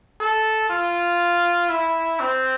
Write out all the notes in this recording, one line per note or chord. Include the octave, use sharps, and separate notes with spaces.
A4
F4
E4
C4